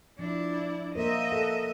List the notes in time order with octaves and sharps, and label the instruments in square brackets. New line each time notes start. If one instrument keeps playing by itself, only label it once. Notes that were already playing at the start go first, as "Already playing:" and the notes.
[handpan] F3 [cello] D4 E4
[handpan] A#3 A#4 C5 [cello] D#5 E5
[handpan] A4 F#5